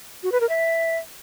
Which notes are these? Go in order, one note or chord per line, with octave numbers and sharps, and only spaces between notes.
F#4
B4
A#4
E5